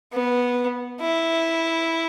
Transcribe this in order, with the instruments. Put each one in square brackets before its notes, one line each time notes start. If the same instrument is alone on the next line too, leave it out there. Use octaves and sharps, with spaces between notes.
[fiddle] B3
E4